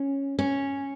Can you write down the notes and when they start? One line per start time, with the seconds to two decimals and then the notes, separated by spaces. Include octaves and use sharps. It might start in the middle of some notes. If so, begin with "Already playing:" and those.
Already playing: C#4
0.39 C#4